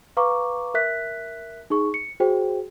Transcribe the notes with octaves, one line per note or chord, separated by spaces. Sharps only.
B4 F5 A#5 C#6 D6
A#4 E5 F#6 B6
D#4 G#4 C#6
C#7
F#4 G#4 C5 G5